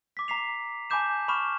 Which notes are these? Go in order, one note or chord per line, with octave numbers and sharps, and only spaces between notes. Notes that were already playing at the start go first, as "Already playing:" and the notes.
D6 B6
A#5 B6 C7 F7
G#5 A5 B5 D6 G6 E7
B5 C#6 D6 F6 E7